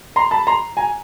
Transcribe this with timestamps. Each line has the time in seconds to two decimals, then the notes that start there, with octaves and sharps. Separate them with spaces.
0.16 A#5 C6
0.31 A5 B5
0.47 A#5 C6
0.77 G#5 A#5